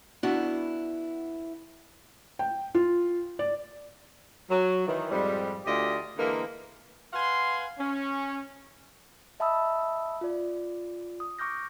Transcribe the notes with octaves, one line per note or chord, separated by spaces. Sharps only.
B3 D4 E4 F#4
G5
F4
D5
F#3
D#3 E3
F2 G#2 G3
D2 F4 G4 D5 D#5
D3 E3 G#3 A#3
B4 F5 F#5 G#5 C6
C#4
D#5 E5 A5 B5 D#6 E6
F4 D5
D#6
C#6 D6 F6 G6 A#6